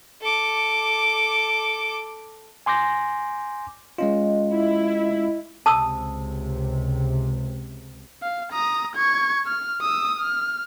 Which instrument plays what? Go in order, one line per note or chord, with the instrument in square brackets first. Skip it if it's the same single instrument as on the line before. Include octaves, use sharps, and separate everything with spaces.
[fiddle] A4 D6
[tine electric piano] G#5 C6 D6 G6 A#6
[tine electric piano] G#3 C#4 F4 [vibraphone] D#5
[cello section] E4
[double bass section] C#2 C3 [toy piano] A5 D#6 E6
[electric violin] F5
A#5 D#6
C#6 G#6
F6
D#6 E6
F6